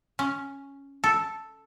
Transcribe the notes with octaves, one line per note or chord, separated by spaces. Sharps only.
C#4
A4